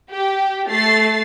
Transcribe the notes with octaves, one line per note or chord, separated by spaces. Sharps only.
G4
A3 A6 C7